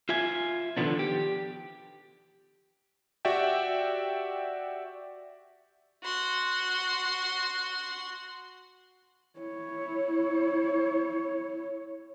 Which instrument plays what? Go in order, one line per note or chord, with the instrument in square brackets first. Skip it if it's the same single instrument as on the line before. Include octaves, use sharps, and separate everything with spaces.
[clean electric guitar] F4 E5 G#5
D3 D#3 F3 B3 D4
G4
[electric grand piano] F#4 G4 D5 E5 G5
[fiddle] F#4 C6
[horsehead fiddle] E4 C#5